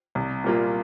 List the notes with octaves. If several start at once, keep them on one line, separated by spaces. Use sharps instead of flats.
C2
A#2 G3 A#3 F4